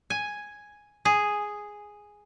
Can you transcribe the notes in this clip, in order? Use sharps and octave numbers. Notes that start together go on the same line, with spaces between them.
G#5
G#4